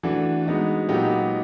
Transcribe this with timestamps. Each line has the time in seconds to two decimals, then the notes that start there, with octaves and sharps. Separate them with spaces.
0.03 E3 A3 D4 F#4
0.46 G#3 B3 D#4 F#4
0.89 A#2 F#3 B3 D#4 G4